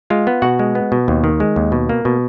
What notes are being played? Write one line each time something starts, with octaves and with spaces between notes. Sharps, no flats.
G#3 F4 F5
B3
B2 F#4 F#5
G#3
B3
B2
D#2
D#3
G#3
D#2
B2
A#3
B2